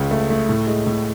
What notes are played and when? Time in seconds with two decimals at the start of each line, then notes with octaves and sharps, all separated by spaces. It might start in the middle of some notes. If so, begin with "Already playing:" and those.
Already playing: C#2 C#3
0.11 A3
0.30 A3
0.49 A2
0.67 G#3
0.87 A2